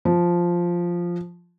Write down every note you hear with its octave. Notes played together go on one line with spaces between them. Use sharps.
F3